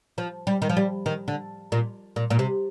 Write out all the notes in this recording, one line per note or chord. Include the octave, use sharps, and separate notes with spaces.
F3
G3
D#3
F3
G3
D#3
D3
A#2
A#2
A#2
C3